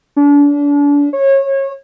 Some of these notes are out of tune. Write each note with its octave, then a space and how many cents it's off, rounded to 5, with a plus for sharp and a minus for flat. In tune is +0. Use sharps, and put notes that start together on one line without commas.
D4 -35
C#5 -25